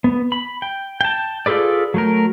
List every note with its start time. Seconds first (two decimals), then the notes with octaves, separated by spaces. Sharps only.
0.04 B3
0.32 B5
0.62 G5
1.01 G5 A5
1.46 F4 G#4 A4 B4 D5
1.94 F#3 A3 A#4